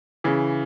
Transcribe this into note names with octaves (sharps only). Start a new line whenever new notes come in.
C#3 E3